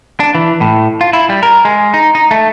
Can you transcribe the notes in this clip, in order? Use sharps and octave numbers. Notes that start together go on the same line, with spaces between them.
D4
E3
A2
F4
E4
G3
A#4
G#3
D#4
D#4
A3